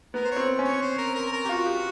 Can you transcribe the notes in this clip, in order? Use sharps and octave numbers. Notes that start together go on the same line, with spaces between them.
B3 A#4
C5
C#5
C4
C#4
C#5
C5
A#4
A#4
A#4
G4
F4 F#4
G4